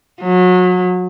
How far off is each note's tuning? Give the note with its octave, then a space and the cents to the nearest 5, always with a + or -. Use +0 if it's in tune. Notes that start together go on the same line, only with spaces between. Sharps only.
F#3 -30